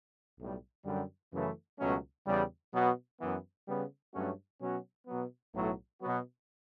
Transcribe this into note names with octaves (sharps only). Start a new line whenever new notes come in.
B1 A2 G3
F#2 D3 G3
F#2 C#3 E3 A3
C#2 B2 F#3 A3 C#4
E2 C#3 G3
B2 F#3 B3 F#4
F#2 E3 B3
C#3 G3 B3
G2 F#3 A3 C#4 F#4
B2 F#3 C#4 F#4
B2 F#3 B3
B1 A2 F#3 A3 E4
B2 F#3 B3 F#4